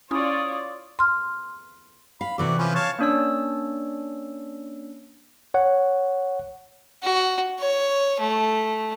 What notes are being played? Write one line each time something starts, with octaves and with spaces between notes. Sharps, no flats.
C#4 E4 F4 C#5 D5 D#6
C6 F6
F5 B5
C3 E3 F#4 A4 D5
F3 C#4 B4
C#5 F5 A5
A#3 C#4 D4 C#5 D5 E6
C#5 F#5
F#4
C#5
A3